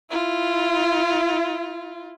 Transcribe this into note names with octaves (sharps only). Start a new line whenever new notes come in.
E4 F4